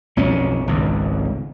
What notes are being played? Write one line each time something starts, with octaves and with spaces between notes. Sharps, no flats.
B1 F2 F#3 C#4
G#1 C#2 B2